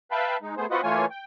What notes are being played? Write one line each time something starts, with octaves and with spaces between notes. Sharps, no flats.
B4 E5 F5 G5 A5 B5
G#3 D#4
A3 B3 G#4 C5
C4 F4 F#4 B4 D#5 F#5
E3 A3 A#3 F4 C#5 G#5
G5